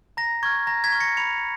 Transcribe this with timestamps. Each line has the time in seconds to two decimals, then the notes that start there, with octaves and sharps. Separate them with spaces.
0.17 A#5 A#6
0.43 C#6 F6 G#6
0.67 A#5 A#6
0.84 G#6 B6
0.92 C#6 F6
1.00 A#6 C#7
1.17 B5 C#7 F7